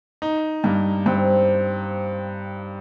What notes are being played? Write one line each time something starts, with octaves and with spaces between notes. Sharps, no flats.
D#4
G2 A#3
G2 C4